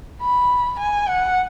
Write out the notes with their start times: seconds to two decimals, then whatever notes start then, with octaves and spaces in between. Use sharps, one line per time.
0.22 B5
0.79 G#5
1.08 F#5